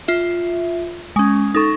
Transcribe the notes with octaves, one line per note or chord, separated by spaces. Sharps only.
F4 E5
G#3 C#4
D#4 A4 C#6